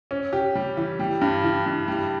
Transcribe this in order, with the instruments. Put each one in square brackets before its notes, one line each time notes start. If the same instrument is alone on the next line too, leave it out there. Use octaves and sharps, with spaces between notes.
[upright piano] C#4
G4
G3
E3
G3
G2
E3
G2
G3